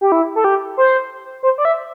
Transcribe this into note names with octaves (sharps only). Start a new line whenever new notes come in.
G4
E4
A4
G4
C5
C5
D5
E5